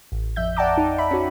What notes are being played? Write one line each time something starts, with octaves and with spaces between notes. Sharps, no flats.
A1
F2 E5 G6
D5 F#5 G5 A5 A#5 D6
D#4
E5 B5
C#4 F#4